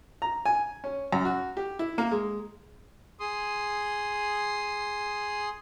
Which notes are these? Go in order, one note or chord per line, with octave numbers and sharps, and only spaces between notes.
A#5
G#5
C#4
F#2
F#4
G4
E4
A#3
G#3
G#4 C6 D#6